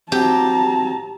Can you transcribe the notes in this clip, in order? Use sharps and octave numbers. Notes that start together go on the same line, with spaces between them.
F#3 C4 G4 A5 A#5